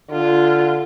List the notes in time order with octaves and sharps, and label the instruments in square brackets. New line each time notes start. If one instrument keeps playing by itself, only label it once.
[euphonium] D3 [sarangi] F4